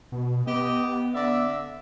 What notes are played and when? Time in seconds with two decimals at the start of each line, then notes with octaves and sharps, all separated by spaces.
0.12 B2
0.47 B3 G4 D#5
1.14 D3 D5 E5